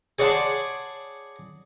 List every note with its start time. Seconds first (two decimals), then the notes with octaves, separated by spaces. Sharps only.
0.19 G#4 C#5 D5 F#5 A5 C6